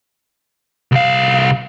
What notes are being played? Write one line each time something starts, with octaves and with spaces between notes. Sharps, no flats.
C2 F5